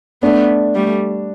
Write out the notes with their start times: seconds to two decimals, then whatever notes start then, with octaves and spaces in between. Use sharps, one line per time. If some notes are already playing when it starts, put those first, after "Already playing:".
0.22 A3 B3 D4
0.75 G3 A3